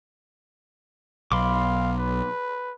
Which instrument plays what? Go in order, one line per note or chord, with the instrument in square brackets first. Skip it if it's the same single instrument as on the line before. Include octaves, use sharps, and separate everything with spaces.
[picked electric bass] B1 [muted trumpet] F5 [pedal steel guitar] B5 C6 D6
[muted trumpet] B4